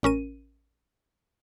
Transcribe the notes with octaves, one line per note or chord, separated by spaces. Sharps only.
A1 C#4 A#4 D#7